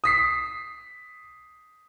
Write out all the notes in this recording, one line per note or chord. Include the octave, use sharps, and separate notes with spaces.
D#6 B6 C7